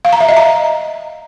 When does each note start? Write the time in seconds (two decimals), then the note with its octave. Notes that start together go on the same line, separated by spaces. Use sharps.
0.05 F5
0.13 A#5
0.21 E5
0.29 D#5
0.37 A#5